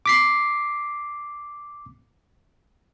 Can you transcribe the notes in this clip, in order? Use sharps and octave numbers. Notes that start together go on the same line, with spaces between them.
D6 B6 C7